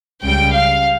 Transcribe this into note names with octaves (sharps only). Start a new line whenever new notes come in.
C#2 C#3 G3 G5
F5